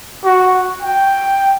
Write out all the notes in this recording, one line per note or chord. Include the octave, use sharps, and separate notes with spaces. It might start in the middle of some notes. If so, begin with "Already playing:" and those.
F#4
G5